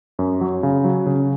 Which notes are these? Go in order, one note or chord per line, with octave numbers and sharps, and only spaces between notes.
F#2
F#3
C#3
F#3
C#3